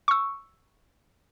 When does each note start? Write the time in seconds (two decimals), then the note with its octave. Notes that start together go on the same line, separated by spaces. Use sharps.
0.08 C#6 E6